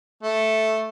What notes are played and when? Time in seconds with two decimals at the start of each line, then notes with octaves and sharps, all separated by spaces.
0.23 A3